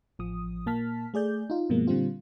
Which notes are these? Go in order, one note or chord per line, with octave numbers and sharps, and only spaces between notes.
A1 F3 D#6
A#2 A#3 A5 F6 B6
A3 G#4 D5 G6
D#4 F4
G2 B2 F3 G#3 A#3
A#2 D3 G3 C4 F4